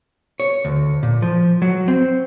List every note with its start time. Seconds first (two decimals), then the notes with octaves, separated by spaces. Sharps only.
0.40 C#5
0.65 D2
1.03 A#2
1.22 F3
1.62 F#3
1.88 C4